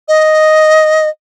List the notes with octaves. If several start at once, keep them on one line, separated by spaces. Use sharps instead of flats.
D#5